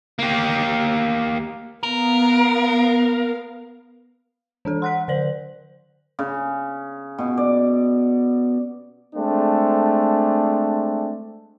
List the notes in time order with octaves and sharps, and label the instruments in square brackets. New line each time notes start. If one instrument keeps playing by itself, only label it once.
[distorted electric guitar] A#3 G4
[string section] B3 F5 [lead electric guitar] A#4
[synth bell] E3 D4 A4
[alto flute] F#5 [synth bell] C6 F#6 B6
[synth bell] D3 D5 F#7 [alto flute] C5
[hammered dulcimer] C#3
B2
D5
[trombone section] G#3 A3 C4 D4